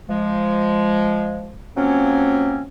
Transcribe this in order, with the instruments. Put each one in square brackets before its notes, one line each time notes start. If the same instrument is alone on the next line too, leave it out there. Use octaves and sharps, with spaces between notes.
[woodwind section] F3 G#3
F3 F#3 A#3 C4 C#4